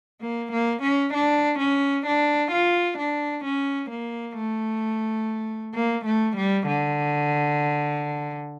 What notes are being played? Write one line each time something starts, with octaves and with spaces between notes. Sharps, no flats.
A#3
A#3
C#4
D4
C#4
D4
F4
D4
C#4
A#3
A3
A#3
A3
G3
D3